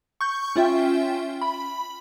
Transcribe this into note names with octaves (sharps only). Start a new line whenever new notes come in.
C#6 G6
C#4 F4 E5 G5
B5